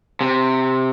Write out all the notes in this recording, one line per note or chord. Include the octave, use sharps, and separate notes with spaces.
C3